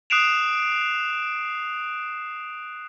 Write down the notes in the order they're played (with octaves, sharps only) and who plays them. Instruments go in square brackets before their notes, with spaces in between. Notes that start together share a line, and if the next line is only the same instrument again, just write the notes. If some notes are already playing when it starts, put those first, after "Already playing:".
[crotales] D#6 F#6 C7 D7 E7 F7